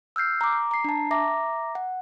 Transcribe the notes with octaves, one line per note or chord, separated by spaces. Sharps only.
E6 F6 G6 C7
A#5 D6
A#5 C7
D4 A5
E5 A#5 D6 A#6
F#5